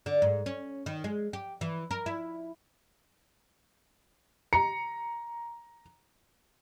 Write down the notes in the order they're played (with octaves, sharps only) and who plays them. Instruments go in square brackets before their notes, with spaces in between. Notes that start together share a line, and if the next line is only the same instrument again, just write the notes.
[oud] D3
G#2
C#4
D#3
G#3
G4
E3
A#4
E4
[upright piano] A#5 C#7